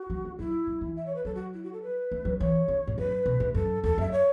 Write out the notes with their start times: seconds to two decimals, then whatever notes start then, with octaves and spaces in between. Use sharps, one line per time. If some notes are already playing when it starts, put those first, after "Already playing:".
Already playing: F#4
0.10 F#3
0.25 A3
0.39 F#3 E4
0.67 F#3
0.81 E3
0.96 E5
1.06 C#5
1.15 B4
1.25 F#3 A4
1.35 F#4
1.54 E4
1.64 F#4
1.73 A4
1.83 B4
2.11 A3
2.25 F#3
2.40 E3 C#5
2.68 C#3
2.87 A2
2.98 F#2 B4
3.26 B2
3.40 A2
3.55 F#2 A4
3.83 E2 A4
3.98 F#2 E5
4.12 C#5